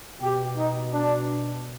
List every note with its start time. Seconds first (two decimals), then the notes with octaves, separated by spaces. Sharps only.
0.21 B2 G4
0.56 D#4
0.92 D4